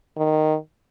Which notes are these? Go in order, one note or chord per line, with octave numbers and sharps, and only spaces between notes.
D#3